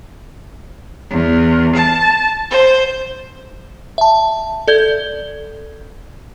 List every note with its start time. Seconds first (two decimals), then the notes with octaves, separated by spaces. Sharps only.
1.11 E2
1.76 A5
2.50 C5
3.98 E5 A5
4.68 A4 D5 G6 G#6 G7